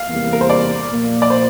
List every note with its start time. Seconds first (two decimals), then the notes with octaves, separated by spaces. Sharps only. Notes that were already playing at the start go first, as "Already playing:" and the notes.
Already playing: F5
0.10 E2 C3 G3 A#3
0.33 A#4
0.41 C5
0.50 D5
0.90 A#2 F3 A#3
1.22 D5
1.30 C5